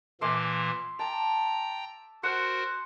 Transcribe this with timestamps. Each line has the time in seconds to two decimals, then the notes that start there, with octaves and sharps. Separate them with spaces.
0.21 A#2 E3 A#3 E5 C6 D6
0.99 G5 A5 A#5
2.23 F#4 A#4 C5 F#5 C6